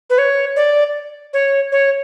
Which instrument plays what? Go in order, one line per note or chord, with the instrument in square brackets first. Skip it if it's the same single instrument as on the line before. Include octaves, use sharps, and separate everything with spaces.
[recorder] B4
C#5
D5
C#5
C#5